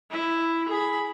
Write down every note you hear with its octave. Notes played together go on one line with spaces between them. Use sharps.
E4
G#4 B5